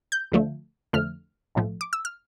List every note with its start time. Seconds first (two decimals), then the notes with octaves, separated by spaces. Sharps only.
0.12 G6
0.32 D2 D3 F3 A3
0.93 F2 D3 F3 A3 F6
1.55 B1 A2 F3 A3
1.81 D6
1.93 E6
2.05 F6